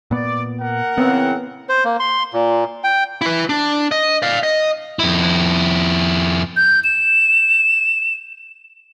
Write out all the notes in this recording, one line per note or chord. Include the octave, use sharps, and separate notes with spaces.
A#2 B3 D5
A#4 F#5
C#3 E3 B3 C4
C5
A#3
C6
A#2
G5
E4 B4
D4
D#5
D5 F5
D#5
F2 E4
G6
E7